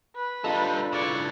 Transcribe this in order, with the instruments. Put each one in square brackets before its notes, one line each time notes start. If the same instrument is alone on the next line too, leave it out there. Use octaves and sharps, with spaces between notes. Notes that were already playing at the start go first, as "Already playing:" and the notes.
[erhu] B4
[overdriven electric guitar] G3 D#4 [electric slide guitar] D4 F4 A4
[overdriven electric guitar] C#3 E3 [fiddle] D5 C#6